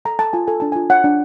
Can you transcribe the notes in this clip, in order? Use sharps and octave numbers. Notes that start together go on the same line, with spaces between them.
A4 A#5
A4 A5
F4 G#5
A4 G#5
D4 A5
F4 G#5
C#5 F#5
D4